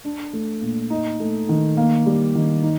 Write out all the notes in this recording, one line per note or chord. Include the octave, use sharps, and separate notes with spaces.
D4
A3
A#2
D#4
A3
D#3
A#3
G3
D#3
D#4